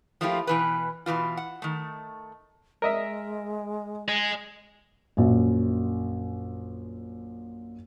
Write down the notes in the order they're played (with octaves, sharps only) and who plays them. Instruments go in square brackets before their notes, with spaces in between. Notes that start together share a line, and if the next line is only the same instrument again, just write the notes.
[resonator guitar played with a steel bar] F3 A3 A#3 E4 F4 G4
B2 E3 B4
B2 D#3 E3 F4
F#5
D#3 A3
[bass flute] G#3 [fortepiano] A#4 D#5 E5
[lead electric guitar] D#5 G#5
[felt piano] A#1 F#2